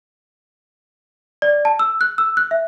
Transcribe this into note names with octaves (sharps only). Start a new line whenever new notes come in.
D5
A5
E6
F#6
E6
F#6
E5